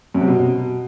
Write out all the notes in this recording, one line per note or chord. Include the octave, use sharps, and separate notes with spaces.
F#2
C3
B2